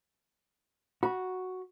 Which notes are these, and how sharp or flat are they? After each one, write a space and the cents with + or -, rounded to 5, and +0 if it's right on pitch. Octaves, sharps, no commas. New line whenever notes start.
F#4 +0 B5 -30